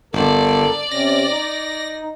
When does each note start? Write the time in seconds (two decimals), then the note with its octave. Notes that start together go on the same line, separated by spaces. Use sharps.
0.13 G1 A4 A#4 D5
0.92 C3 C#4 A#6
1.30 D#4